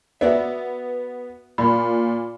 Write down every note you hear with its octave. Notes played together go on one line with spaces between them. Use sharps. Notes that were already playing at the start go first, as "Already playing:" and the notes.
B3 F#4 D5 E5
A#2 B5